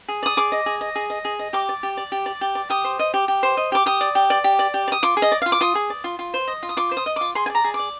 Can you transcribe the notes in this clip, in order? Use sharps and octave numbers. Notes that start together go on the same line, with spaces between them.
G#4
D5 D#6
G#4 D6
D#5
G#4
D#5
G#4
D#5
G#4
D#5
G4 D6
D5
G4
D5
G4
D5
G4
D5
G4 D#6
C5
D#5
G4
G4
C5
D#5
G4 D6
G4 D#6
D5
G4
D5
G4
D5
G4
D5
D#6
F4 D6
G#4
D#5
D5
F4 F5
D6
F4 D#6
G#4
D5
F4
F4
C5
D#5
F4
D#6
F4 D6
C5
D#6
D#5
F4 D6
G#4 C6
G#5
D5
A#5
G#4
D6
D5